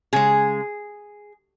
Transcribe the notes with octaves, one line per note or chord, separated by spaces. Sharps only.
C#3 G#3 G#4